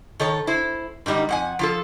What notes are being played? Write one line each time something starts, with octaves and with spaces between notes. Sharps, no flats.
D#3 A4 C#5
E4 C5
G#2 D#3 G3 D#4
F2 F#5 G#5
F3 F4 A4